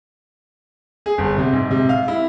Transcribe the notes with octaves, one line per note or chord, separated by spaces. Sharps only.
G#4
G1
C3
G#2
C3
F5
E4